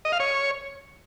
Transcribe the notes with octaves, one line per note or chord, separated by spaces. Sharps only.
D#5
F5
C#5